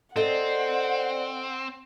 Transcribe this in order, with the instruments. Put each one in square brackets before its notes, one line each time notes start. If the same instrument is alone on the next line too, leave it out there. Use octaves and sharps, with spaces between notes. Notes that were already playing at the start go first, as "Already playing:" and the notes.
[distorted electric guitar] C4 [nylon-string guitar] A4 D#5 [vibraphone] C5 D5 [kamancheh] F#5